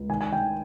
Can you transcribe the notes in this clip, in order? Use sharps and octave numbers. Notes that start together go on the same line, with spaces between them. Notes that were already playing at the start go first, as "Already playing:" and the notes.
Already playing: C#2
D#3 G#5
G#5
D#3 G5